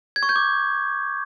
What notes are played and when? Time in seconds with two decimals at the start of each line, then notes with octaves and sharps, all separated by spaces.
0.16 G#6
0.23 C#6
0.29 G6
0.36 D6